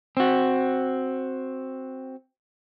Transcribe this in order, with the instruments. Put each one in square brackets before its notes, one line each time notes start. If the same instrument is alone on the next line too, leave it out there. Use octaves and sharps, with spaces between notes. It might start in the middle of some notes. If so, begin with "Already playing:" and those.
[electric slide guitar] C4 F#4